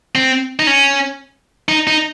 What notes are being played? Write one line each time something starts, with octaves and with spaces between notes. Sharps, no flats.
C4
D#4
C#4
D#4
D#4